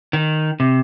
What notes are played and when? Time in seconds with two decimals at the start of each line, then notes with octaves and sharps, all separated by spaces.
0.13 D#3
0.60 C3